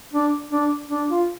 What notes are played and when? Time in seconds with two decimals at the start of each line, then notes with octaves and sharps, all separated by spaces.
0.13 D4
0.51 D4
0.90 D4
1.10 F4